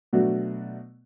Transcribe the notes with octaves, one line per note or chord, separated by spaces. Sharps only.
B2 F#3 A3 D4 F#4